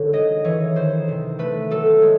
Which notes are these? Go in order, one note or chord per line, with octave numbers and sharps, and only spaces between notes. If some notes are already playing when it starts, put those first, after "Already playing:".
Already playing: D3 D#3 F#3 C#5
G#3 D#5
E3 C#5
D#3 C5
C3
A3 B4
F#3 A4
G#3